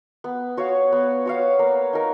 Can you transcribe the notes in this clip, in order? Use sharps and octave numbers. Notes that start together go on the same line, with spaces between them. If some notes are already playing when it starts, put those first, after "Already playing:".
B3
F#4 C#5 F5
B3
F#4 C#5 F5
A#3
D#4 A#4